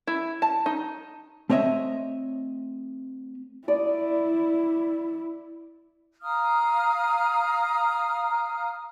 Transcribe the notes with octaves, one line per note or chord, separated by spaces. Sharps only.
E4
A5
D#4
A3 C4 C#5 D#5 E5
E4 D5 D#6
F5 A#5 D#6 F6